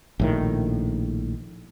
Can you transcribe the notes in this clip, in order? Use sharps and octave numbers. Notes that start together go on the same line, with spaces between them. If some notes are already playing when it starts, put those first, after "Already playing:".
A#1 A2 D#3